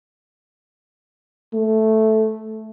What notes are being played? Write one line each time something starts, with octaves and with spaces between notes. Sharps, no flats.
A3